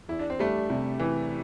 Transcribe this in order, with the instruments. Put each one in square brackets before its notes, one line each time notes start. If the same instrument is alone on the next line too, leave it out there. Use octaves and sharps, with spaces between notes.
[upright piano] E2 [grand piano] E4
[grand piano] D4
C4
[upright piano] G3 [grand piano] A3 D4
[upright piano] C3
E3